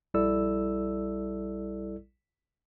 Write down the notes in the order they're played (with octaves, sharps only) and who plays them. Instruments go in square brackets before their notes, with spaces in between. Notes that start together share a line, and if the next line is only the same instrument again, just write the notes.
[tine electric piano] A#1 G3 E4 A4 D5 E6